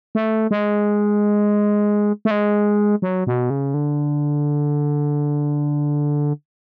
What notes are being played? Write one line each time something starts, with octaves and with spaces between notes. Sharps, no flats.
A3
G#3
A3
G#3
F#3
B2
C#3
D3